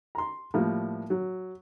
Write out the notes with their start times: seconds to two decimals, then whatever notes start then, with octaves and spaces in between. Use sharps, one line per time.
0.15 A#5 C6
0.54 A2 F3 G3 A#3
1.10 F#3